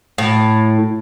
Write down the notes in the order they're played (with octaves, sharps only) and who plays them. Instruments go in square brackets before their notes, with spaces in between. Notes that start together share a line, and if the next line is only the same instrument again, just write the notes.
[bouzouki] A2